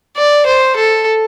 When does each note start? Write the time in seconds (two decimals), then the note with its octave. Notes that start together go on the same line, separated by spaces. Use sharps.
0.17 D5
0.46 C5
0.76 A4